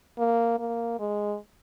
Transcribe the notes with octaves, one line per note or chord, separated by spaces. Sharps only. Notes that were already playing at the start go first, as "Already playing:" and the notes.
A#3
A#3
G#3